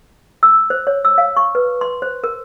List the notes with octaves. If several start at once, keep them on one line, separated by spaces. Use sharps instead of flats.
E6
C5
C#5
E6
F5
C#6
B4
C6
C5
A#4